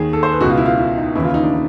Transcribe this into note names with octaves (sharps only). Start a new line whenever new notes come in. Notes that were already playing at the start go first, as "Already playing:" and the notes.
Already playing: D#2 D#3 G#4
A4
C5
B4
C#2 B2 F#4
F4
E4
F4
E4
D#4
D#2 C#3 E3 E4
F4
D#4
D4
D#4